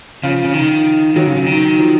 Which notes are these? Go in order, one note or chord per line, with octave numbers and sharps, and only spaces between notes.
C#3 F3 F4
C#3
D#3
D#3 F#3
C#3
C#3
D#3
F3